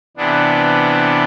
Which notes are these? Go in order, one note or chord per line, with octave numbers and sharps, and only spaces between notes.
C3 E3 B3 D4